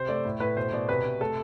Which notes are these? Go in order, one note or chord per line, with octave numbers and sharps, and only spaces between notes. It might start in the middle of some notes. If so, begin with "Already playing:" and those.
Already playing: C3 C5
A3 D5
A2
A2 B4
B2 C5
B2 D5
C3 B4
C3
A3 A4